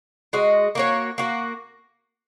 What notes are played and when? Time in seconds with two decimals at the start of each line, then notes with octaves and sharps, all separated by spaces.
0.33 G#3 F#4 D#5
0.75 A#3 F#4 C#5
1.18 A#3 F#4